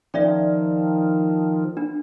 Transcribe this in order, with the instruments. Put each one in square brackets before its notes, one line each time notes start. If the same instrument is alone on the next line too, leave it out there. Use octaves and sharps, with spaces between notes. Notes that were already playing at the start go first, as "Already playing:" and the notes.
[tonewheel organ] D#3 F3 [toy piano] C#4 D5 E5
[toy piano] D4